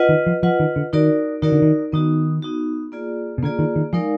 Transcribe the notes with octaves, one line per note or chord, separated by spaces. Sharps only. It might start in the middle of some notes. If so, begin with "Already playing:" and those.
Already playing: F4 B4 D#5 F#5
D#3
F3
F3 F4 B4 D#5 F#5
D#3
D3
D#3 D#4 F#4 A#4 D5
D#3 D#4 F#4 A#4 D5
D3
D#3
D#3 B3 D#4 F#4
B3 D#4 F#4
A#3 F4 G#4 D5
B2
D3 A#3 F4 G#4 D5
D#3
D#3
F3 G#3 D#4 A#4 D5 F5